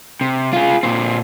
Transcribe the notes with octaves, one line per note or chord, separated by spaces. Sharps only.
C3
F4 G#4
A#2 C4